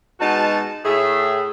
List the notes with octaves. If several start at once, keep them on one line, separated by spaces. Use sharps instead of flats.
B2 G#3 D#4 F#4 A5
A2 G#4 E5